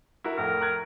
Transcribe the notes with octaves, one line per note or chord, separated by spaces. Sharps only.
E4 F#4 A#4
F2 A2 A#4
A#5 F#6 G#6